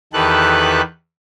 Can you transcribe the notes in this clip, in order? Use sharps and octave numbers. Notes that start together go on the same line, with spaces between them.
E2 D#3 G4 A4 B4 F#6